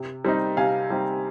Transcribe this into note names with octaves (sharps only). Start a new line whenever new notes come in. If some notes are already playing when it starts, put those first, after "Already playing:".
Already playing: C3
G3 C4 D#4
C3 F5 G#5
G3 C4 D#4